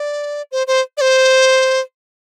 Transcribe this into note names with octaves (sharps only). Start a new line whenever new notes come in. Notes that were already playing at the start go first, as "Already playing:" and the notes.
Already playing: D5
C5
C5
D5
C5